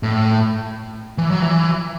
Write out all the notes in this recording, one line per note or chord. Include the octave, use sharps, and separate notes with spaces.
A2
E3
F#3
E3